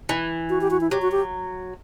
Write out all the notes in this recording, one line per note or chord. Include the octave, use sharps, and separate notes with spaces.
E3
F#4
G4
F#4
E4
F#3 G4
F#4
G4